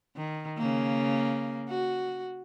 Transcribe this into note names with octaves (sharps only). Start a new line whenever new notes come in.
D#3
C#3 A#3
F#4